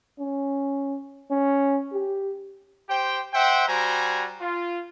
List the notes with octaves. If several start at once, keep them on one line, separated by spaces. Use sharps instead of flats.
C#4
C#4
G4
G4 C5 G5
C5 E5 F#5 G5
G3 F#4 C5 G#5 A#5
F4